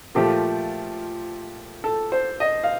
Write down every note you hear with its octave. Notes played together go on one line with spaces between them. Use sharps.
A#2 F3 A3 G4
A4
C5
D#5
F5